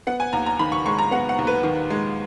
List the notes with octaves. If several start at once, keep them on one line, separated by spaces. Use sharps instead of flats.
B3 F#5
G#5
D#2 A#5
A#5
D#3 B5
C#6
G#3 C#6
A#5
B3 F#5
F#5
D#2
B4
D#3
G#3